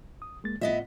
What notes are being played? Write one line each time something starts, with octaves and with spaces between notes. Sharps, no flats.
D#6
G#3 A#3 A6
A2 B3 F4 D#5 E5